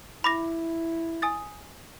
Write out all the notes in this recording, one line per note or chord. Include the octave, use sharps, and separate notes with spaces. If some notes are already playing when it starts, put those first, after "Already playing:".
E4 B5 D6 A#6
G#5 D#6 A6